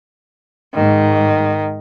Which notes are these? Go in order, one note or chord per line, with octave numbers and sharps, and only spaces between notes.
G#2 D#3